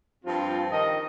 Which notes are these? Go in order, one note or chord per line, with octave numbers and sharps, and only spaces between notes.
G2 F3 C4 F4
D#3 D#5